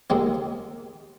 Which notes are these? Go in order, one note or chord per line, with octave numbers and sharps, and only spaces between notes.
D#2 D#3 G#3 C4